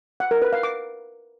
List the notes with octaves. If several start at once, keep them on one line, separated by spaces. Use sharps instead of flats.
F#5
A#4
B4
F5
D6